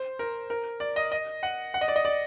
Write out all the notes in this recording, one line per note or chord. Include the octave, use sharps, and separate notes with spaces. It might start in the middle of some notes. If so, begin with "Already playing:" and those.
Already playing: C5
A#4
A#4
D5
D#5
D#5
F#5
F#5
D#5
D5
D#5
D5